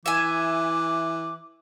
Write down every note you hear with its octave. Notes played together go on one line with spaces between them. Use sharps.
E3 E5 G#5 D6